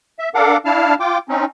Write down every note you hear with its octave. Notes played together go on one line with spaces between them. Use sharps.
E5
D4 A4 A#4 F5 F#5 D6
D4 E4 F5 A5 F6
F4 G5 D6
C4 C#4 D#4